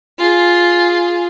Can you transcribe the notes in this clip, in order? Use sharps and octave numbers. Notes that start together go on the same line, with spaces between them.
F4 G#4